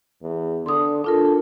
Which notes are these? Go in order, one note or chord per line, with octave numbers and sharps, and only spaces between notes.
E2
D3 C6 D6 D#6
D4 F4 A4 A#4